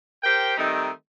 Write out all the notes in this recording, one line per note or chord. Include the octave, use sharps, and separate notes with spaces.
G4 A#4 C5 G5
D#3 G3 A3 C4 D#4